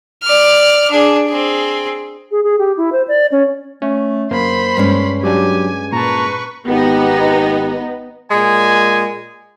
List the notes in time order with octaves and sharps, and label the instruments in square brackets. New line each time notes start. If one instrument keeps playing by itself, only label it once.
[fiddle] D5 F6
D4 G#4
C4 G#4
[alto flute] G#4
G#4
G4
E4
C5
D5
C#4
[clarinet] A3 [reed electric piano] C#4
[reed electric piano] F#2 A#3 [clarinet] C5 [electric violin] B5 C6
[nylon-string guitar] G2 G#3 C#4
[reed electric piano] F#3 G3 D4 [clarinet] G4 [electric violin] G#5
[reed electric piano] A#2 A5 [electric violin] B4 C#6 [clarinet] A#5
[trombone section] G#1 G4 [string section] B3 D#4
[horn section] A#2 G#3 G#5